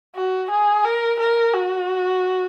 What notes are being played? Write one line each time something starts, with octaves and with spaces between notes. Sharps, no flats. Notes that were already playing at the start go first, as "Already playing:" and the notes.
F#4
G#4
A#4
A#4
F#4